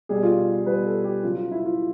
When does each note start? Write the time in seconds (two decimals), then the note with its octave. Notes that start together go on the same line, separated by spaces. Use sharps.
0.09 B2 G3 G#4
0.23 F4
0.38 F4
0.52 F4
0.66 B2 G3 B4
0.86 A4
1.04 G4
1.23 C#3 F#3 F4
1.37 F4
1.51 E4
1.65 F4